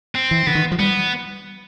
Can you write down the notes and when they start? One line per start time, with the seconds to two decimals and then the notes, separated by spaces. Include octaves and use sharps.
0.15 C4
0.31 E3
0.47 D3 B3
0.55 D#3
0.72 F3
0.79 G3 B3